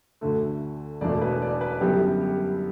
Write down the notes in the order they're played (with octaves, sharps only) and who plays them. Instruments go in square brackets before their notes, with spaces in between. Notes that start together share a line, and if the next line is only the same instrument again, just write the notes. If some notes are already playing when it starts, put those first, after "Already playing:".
[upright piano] D2 D3 A3
E1 E2 B2 A3 D4 D5
B4
D5
B4
F#2 D3 G3 B3 E4 G4
G4